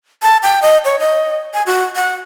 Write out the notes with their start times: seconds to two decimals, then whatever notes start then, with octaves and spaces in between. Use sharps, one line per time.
0.23 A5
0.43 G5
0.62 D#5
0.85 C#5
0.99 D#5
1.54 G#5
1.66 F#4
1.96 F#5